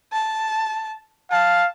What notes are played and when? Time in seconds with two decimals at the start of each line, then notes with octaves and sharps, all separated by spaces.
0.13 A5
1.32 F5 A5